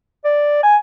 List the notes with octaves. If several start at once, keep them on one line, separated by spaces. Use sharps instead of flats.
D5
G#5